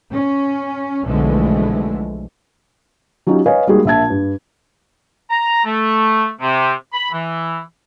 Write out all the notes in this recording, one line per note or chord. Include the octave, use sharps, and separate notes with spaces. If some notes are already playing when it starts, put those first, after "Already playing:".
C#4
B1 D3 E3 F3 G#3 A3
F#3 C#4 D#4 F4 G4
B4 C#5 D#5 F5 G#5
G3 G#3 A#3 D#4 F#4 G#4
A#1 A#2 E5 A5 G#6
G2
A#5
A3
C3
B5
E3